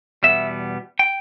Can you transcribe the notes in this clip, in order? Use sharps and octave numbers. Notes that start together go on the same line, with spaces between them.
E2 B2 G3 B3 E5
G5